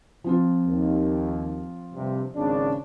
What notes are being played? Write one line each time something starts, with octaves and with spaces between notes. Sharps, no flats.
F3 C4 F4
D#2
G2 C3
G#1 C#3 D4